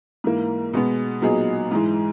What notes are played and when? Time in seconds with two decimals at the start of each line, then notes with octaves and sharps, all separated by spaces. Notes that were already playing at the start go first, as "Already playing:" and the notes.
0.24 G#2 E3 A#3
0.73 B2 G#3 B3
1.22 A#2 F#3 B3 D#4 G#4
1.71 G#2 E3 G#3